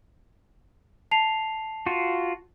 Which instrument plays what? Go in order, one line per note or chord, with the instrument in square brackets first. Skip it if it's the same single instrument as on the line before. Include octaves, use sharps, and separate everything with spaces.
[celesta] A5 C7 F7
[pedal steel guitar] F4 F#4